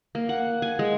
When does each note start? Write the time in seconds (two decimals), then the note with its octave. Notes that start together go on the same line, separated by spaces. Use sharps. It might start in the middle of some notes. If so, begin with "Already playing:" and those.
0.15 A#3
0.29 F#5
0.62 G#5
0.79 G#3